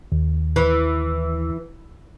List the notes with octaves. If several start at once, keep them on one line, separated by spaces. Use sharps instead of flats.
D#2
E3